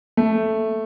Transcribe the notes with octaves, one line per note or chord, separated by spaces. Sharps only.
A3